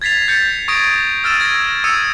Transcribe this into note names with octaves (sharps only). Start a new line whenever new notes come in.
G#6 A6 B6 C7 F7
G6 A6 C#7
C#6 D#6 G#6 A#6 D7
E6 F6 A6 D#7 E7
G#6 A#6
D#6 E6 G#6 C#7 D#7 E7